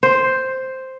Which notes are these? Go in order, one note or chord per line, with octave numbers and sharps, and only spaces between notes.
C5